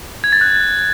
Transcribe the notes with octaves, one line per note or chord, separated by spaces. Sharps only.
G#6
A6
F#6